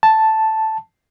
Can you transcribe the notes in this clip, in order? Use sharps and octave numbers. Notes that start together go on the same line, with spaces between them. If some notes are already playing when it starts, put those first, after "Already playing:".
A5